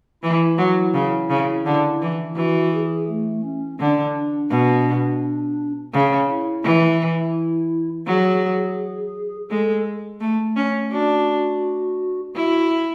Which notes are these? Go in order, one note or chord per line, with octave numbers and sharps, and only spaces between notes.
E3 E4
F#3
C#3
C#3
D3
E3
E3 F#4
G#4
A3
C#4
D3 D4
B2
C#3 C#4
E4
E3
F#3 G#4
G#3 A4
A3
C#4
D4 F#4
E4 F#4